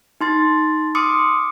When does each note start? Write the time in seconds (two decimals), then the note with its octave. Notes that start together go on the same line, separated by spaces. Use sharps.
0.21 D#4 C6 A6
0.95 C6 D6 D#6 F6 C#7